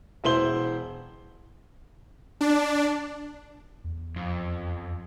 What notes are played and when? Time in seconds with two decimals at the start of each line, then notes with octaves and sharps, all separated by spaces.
0.24 E1 E4 C5 G7
2.41 D4
3.84 E2
4.16 F2